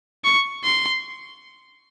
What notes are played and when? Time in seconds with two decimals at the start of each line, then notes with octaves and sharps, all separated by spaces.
0.24 C#6
0.64 C6